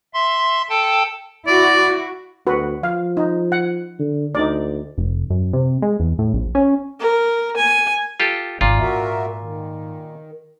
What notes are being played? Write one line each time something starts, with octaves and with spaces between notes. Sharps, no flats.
E5 C6
A4 G5 A5
E4 F#4 D5
D2 F#4 B4
F3 F5
D#4
F#5
D3
D2 D#4 D5
F1
F#2
C3
G#3
E2
A2
A#1
C#4
A#4
G#5
F4 G4 A4
G#1 A#2 F4
G#2 F#4 A#4 E5
D#3